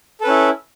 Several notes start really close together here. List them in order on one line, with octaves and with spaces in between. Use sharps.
A4 B4 C#4 E4